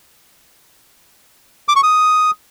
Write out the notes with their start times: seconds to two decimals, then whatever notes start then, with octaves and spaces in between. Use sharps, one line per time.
1.69 D6
1.76 C#6
1.83 D#6